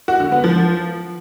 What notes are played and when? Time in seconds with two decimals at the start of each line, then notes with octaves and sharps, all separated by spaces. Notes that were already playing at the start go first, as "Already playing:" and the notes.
0.08 F#4
0.20 D3
0.32 B3
0.44 F3